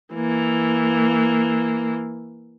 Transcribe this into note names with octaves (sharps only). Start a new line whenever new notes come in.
E3 A#3